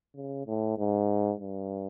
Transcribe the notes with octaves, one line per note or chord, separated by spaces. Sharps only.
C#3
A2
G#2
G2